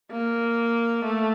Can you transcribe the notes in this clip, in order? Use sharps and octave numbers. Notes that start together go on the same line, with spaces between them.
A#3
A3